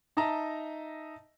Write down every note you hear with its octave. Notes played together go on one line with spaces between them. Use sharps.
D#4 D#5 E5 A5 A#5